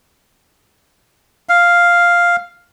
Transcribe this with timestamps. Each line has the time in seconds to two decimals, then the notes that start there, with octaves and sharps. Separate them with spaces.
1.49 F5